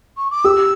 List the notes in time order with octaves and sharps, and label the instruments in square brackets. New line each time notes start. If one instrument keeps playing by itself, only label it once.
[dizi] C#6
D6
[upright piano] G4 [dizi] E6